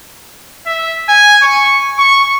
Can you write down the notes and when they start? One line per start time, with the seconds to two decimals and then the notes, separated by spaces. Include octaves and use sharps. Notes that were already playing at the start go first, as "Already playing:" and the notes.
0.66 E5
1.08 G#5
1.42 C#6
1.98 C#6